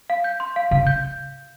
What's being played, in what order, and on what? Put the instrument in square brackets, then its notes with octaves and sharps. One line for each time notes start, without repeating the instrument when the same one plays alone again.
[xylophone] F5
G6
C6
F5
[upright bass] C#3 [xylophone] F5
[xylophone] G6